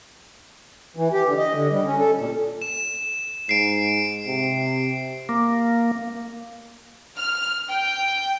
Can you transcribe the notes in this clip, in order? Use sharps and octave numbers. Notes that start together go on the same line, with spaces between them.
E3
G4
D3
D#5
D3
G3
C#4
A4
A#2
E7
G#2 C7 D7
C3
A#3
F6
G5